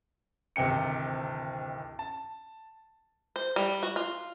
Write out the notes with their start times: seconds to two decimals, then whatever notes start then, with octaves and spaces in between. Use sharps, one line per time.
0.56 D1 G#1 C3 G5 C#7
1.99 A5
3.36 C5
3.56 G3
3.83 F#4
3.96 F4